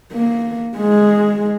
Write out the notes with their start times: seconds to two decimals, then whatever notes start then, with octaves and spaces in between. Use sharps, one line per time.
0.12 A#3
0.77 G#3